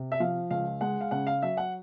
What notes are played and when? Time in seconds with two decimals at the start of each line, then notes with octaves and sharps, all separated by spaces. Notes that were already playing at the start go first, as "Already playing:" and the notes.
Already playing: C3
0.12 E5
0.20 F3 F5
0.50 C#2 F5
0.81 G#3 F#5
1.01 F5
1.11 C#3 F#5
1.27 F5
1.42 F#3 E5
1.57 F#5